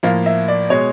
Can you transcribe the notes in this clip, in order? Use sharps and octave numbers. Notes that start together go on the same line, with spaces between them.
A2 F3 A#3 F5
E5
D5
B2 G#3 C#5